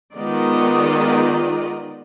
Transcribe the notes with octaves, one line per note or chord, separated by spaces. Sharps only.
D#3 G#3 B3 F4 D5 D#5